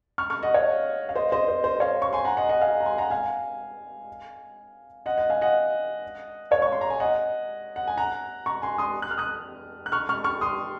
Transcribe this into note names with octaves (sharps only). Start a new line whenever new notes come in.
C#6 F6
C#6 F6
D#5 F#5
C#5 F5
F5
C5 D#5
C5 D#5
C5
C5
C#5 F5
C#6
G#5 C6
F#5 A#5
D#5 F#5
D#5 F#5
F5 G#5
A#5
G#5 C6
F#5 A#5
F5 G#5
D#5 F#5
D#5 F#5
F5 G#5
D#5 F#5
C#5 F5
C#6
C6
A#5
G#5
D#5 F#5
F#5
G#5
F#5 A#5
A#5 C#6
G#5 C6
C6 D#6
F#6
F6
D#6 F#6
F#6
C#6 F6
C#6 F6
C#6 F6
C6 D#6